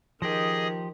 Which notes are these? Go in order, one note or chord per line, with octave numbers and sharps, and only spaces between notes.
D#3 F3 G4 G#4 D#5 D#6